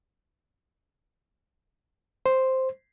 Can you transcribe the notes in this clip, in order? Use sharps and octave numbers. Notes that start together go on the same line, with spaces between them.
C5